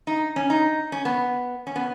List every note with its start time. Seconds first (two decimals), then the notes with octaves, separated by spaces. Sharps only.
0.07 D#4
0.36 C#4
0.50 D#4
0.92 C#4
1.05 B3
1.67 C#4
1.76 B3